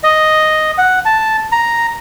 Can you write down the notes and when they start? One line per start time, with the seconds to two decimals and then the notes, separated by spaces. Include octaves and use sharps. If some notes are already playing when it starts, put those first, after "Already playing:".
0.03 D#5
0.78 F#5
1.05 A5
1.52 A#5